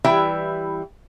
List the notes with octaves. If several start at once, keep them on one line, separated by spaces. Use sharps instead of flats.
E3 G3 E4 G4 E5 G5